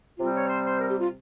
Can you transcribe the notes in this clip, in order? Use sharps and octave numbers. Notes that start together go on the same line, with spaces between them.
C3 G3 C4 F4
C#5
C5
C5
A#4
G4
F4